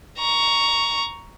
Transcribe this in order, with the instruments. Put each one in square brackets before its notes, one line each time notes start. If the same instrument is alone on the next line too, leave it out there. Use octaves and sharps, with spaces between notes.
[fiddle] A#5 C#6